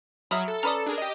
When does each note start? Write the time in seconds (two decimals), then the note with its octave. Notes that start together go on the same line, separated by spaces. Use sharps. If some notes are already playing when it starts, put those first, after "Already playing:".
0.31 F#3 G#4 E5 A#5 B5 D#6 F6
0.48 A4
0.63 C#4 B4 D5 A#5 D#6
0.86 D4 G#4 A#4
0.98 G4 D#5